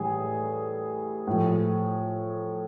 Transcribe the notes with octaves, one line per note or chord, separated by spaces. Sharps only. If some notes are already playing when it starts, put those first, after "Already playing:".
Already playing: A2 E3 G3 G#4
A2 F3